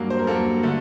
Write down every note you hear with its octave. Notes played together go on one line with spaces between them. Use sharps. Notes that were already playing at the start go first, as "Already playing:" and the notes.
Already playing: G2 F#3 A#3
C5
A#4
G2 F#3 A#3 A4
D3 A3